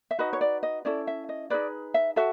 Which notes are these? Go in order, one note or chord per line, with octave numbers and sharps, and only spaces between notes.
E5
D#4 F#4 B4 D#5
C#5
D5
D#5
C#4 E4 A4 D5
E5
D#5
D#4 G#4 B4 D5
E5
F#4 A4 E5